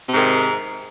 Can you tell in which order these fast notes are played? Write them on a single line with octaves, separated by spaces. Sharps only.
C3 G#2 D#3